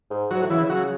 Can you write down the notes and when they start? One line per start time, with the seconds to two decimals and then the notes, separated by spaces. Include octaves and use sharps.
0.10 G#2
0.30 G#2 F#3 F#4
0.40 A2
0.50 C#3 E3 E4
0.60 C#3 E4
0.70 F#3 F#4